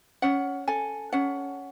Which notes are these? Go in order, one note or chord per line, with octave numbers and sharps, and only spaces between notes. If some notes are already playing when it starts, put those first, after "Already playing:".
C#4 F#5
A4 G#5
C#4 F#5